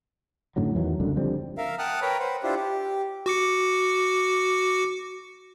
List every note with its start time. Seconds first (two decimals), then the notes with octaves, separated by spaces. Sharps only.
0.56 F#2 A2 D3 F#3
0.75 E2 D#3 E3 F#3
1.00 C#2 F#2 D3
1.17 D3 F3 G3 C4
1.58 A#4 E5 F5
1.79 F#5 G5 A5 D#6 F6 F#6
2.02 A#4 B4 C#5 G5 A#5 B5
2.19 B4 C5 F#5
2.43 D4 E4 F4 G4 C5
2.56 G4
3.26 F#4 D6 C#7